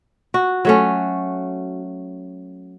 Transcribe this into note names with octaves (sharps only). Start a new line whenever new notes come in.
F#4
F#3 A3 C#4